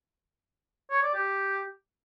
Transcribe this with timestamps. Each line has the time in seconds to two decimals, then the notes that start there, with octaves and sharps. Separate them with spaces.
0.91 C#5
1.03 D5
1.15 G4